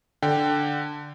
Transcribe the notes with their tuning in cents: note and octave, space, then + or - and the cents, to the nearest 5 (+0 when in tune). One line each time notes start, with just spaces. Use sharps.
D3 +0 G5 +0